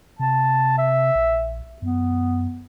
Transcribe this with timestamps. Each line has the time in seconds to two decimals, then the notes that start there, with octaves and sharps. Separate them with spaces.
0.19 C3 A5
0.78 E5
1.15 A#1
1.82 F#2 B3